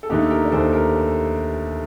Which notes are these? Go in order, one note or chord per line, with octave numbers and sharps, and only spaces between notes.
A4
D#2 D3 A3 D#4 G4
G4 A#4
D5
D#2 D3 A3 A4 C5
G4 A#4